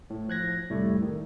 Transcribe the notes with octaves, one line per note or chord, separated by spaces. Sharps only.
A2
F3 F#6 G#6 A#6
C2 F2 A2 G3 A3
D#3